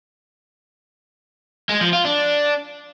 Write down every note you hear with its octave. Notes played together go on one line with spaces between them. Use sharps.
G#3
F3
F4
D4